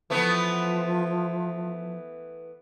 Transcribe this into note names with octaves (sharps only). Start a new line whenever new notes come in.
E3 F3 A3 B3